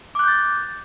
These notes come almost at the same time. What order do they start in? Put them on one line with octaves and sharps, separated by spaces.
D6 F#6 G6 A6